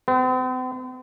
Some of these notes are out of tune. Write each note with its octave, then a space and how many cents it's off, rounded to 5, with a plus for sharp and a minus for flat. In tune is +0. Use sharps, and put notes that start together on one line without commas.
C4 -45